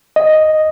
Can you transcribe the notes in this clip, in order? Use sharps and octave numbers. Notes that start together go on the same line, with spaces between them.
D#5